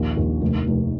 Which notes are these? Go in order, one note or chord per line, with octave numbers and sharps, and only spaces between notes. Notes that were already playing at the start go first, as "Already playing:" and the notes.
Already playing: A#1 D#2
D#2
F1
F1